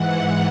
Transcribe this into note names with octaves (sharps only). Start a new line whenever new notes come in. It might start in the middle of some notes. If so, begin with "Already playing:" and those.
Already playing: G#2 E3 F#5